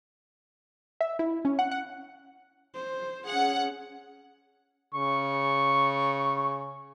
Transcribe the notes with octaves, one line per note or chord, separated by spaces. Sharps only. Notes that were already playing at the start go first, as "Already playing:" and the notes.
E5
E4
C#4
F#5
F#5
C5
C#4 G#4 F#5
C#3 C#6